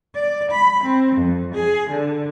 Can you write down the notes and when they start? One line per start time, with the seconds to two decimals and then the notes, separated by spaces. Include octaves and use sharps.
0.15 D5
0.51 B5
0.83 C4
1.17 F2
1.54 G#4
1.90 D3